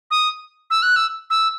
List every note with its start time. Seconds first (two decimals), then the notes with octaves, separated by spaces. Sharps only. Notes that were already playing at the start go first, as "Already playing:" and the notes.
0.11 D#6
0.70 E6
0.82 F#6
0.96 E6
1.30 E6